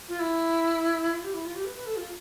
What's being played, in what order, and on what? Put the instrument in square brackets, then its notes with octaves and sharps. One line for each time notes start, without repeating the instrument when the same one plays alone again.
[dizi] F4
E4
F4
G4
E4
F4
G4
B4
B4
A4
F4